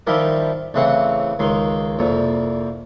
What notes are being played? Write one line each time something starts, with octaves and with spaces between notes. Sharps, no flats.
D#3 F3 G3 E4 G4 A#4
A1 C#3 E3 C4 F#5 C#6
C#2 D#3 G#3 C6
C2 F2 A#2